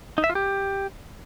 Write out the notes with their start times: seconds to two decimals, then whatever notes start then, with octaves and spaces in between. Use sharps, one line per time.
0.18 D#4
0.24 E5
0.30 F4
0.35 G4